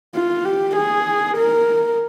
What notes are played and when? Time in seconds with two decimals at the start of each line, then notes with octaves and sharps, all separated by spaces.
0.15 F4
0.45 G4
0.76 G#4
1.37 A#4